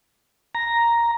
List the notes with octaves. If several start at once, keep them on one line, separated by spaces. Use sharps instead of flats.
A#5